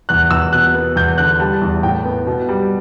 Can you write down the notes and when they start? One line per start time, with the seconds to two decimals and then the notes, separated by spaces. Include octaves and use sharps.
0.09 E2 F#6
0.31 E2 E6
0.53 B2 F#6
0.75 B3
0.96 E2 G6
1.18 D3 F#6
1.40 G3 A5
1.62 E2
1.83 A2 G5
2.05 B3
2.27 B2
2.49 G3